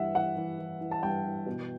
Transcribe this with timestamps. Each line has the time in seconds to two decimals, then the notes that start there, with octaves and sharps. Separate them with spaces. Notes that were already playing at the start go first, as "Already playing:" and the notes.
Already playing: G2 E3 E5 F#5
0.15 E3 F#5
0.37 E3
0.59 E3
0.81 E3
0.91 A5
1.03 G2 G5
1.24 E3
1.46 B2